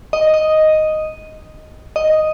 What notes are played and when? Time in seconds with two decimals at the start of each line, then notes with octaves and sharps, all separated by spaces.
0.13 D#5
0.34 D#5
1.96 D#5